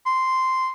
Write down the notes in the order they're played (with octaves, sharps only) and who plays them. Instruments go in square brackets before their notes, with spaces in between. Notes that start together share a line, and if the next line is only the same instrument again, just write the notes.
[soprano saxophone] C6